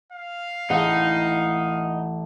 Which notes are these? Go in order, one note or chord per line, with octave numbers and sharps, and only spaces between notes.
F5
A1 D#4 F#5